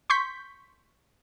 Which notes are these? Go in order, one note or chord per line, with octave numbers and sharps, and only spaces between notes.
C6 C#6 G6 B6